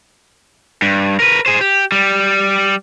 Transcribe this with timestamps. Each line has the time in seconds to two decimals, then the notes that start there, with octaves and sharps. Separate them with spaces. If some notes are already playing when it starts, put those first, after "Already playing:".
0.82 G2
1.20 A#4 B4
1.46 G#4 C5
1.61 G4
1.92 G3